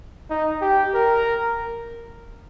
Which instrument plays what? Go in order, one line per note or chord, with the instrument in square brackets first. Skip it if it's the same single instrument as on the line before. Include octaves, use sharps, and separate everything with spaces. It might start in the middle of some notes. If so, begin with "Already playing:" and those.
[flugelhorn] D#4
G4
A#4